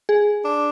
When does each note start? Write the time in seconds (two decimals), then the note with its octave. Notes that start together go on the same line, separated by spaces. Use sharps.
0.09 G#4
0.45 D4